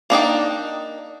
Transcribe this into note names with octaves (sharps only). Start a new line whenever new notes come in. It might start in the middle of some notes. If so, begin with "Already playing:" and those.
A#3 D4 D#4 G5